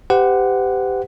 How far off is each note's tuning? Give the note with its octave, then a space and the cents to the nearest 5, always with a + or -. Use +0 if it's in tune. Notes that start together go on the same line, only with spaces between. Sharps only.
G4 +0 C5 -45 F#5 +0